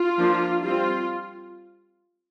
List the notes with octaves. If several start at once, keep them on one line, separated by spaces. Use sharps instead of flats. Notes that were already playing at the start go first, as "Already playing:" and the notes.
Already playing: F4
F3 A#3 D4
G3 C4 F4